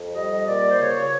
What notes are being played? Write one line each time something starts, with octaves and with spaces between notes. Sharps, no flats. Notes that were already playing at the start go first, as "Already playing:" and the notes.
Already playing: F2
G3 D#5
A#2 D5
C5
C#3 C#5
C#5